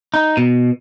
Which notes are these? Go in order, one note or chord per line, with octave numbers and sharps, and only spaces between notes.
D#4
B2